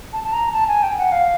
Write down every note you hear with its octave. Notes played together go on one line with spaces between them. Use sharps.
A5
A5
A#5
A5
G#5
G5
F#5
F5